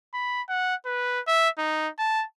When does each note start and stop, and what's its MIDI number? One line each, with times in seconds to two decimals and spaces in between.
0.14 0.42 83
0.49 0.75 78
0.86 1.20 71
1.27 1.49 76
1.58 1.89 63
1.99 2.25 81